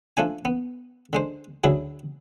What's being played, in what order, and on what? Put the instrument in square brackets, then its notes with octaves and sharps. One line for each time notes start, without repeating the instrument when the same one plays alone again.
[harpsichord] F3 A3 D4 G#5
B3
D3 G#3 C5
D2 D3 F#3 E4 G#4